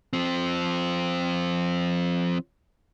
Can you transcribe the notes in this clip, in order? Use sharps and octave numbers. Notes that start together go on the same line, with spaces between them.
F3 C4